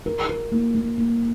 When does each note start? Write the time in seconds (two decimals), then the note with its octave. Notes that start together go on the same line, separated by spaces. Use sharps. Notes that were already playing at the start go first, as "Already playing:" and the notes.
0.06 A#4
0.29 A#4
0.52 A#3
0.75 A#3
0.98 A#3